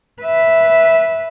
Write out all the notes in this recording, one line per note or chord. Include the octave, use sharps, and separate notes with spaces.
B4 E5